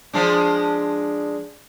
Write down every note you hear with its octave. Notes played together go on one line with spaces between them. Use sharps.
F3 G#3 D4